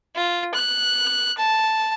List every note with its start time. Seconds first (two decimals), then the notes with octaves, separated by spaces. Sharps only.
0.15 F4
0.54 F#6
1.38 A5